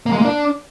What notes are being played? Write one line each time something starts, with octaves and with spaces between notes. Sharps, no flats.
A#3
G#3
A#3
D4